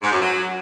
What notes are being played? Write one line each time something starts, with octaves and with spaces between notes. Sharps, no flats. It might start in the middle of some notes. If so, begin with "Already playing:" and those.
G#2
F#2
F#3